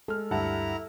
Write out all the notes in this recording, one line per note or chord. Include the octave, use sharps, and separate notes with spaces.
G#3 A4 F6
D2 G2 G3 E4 F#5 A5 A#5